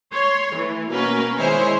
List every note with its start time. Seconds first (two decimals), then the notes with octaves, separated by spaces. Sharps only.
0.13 C#5 C6
0.55 E3 A3
0.90 B2 A#3 C#4 A#4 B4
1.37 D#3 G#3 E4 G#4 C5 C#5